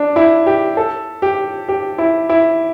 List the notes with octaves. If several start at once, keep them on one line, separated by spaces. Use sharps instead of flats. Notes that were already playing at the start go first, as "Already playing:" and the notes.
Already playing: D4
E4
G4
A4
G4
G4
E4
E4